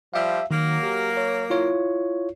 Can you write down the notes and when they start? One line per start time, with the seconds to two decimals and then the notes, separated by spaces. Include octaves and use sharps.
0.14 F3 G3 E5 F5
0.51 D#3 F#3 A#3
0.83 G4
1.17 C#5
1.50 E4 F4 C#5